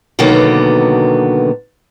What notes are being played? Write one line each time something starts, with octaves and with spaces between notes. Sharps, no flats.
B2 D3 D#3 F#3 A#3 B3